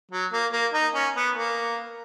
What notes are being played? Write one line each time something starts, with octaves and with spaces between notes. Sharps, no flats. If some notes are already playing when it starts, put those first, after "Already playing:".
F#3
A#3
A#3
D#4
C#4
B3
A#3